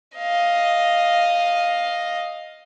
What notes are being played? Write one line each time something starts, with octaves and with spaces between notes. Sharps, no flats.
D#5 F5